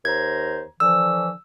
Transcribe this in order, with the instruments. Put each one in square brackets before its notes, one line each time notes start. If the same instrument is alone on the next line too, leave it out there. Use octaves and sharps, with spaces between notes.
[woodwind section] D#2 C5 A#5 [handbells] G#6
[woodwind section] D3 E3 F3 [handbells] E6